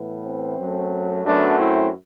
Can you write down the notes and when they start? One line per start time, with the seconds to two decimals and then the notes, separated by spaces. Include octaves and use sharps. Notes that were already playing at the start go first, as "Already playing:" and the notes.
Already playing: A2 E3 B3
0.24 C4
0.57 F#2 F#3 A3
1.24 F#2 F#3 A3 B3 D4
1.58 C4 E4